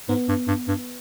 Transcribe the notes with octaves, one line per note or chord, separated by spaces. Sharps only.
G#2 B3
G2
G2
G2